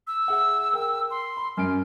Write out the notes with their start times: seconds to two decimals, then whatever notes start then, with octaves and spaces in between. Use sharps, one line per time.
0.07 E6
0.28 G#4 E5 F#5
0.73 A#4 G5
1.11 C6
1.37 B5
1.57 F#2 F6 D7